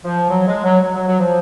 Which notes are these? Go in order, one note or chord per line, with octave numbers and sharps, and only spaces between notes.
F3
F#3
G#3
F#3
F#3
F#3
F#3
F3